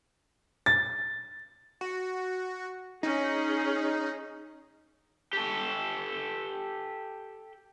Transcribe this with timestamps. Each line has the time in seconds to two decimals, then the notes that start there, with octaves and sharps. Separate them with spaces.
0.66 A6
1.81 F#4
3.03 C#4 D#4 G#4
5.33 G4 A4